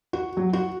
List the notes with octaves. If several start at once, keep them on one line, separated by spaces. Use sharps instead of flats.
F#4
F#3
F#4